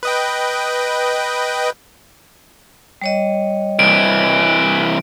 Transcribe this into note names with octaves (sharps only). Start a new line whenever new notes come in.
B4 D#5 G5
G3 C#5 D#5
C2 E3 D7